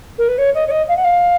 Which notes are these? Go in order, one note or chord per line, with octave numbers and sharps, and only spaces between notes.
A#4
B4
C#5
D#5
C#5
D#5
F5
F#5
F5